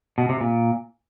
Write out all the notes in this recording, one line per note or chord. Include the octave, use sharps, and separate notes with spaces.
B2
C3
A#2